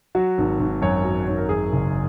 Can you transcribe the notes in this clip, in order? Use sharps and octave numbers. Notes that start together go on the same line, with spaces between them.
F#3 F#4
G#1
G#1
F#2 C#5
F#3
G#1 C#5
A#4
F#2 G#4
F#1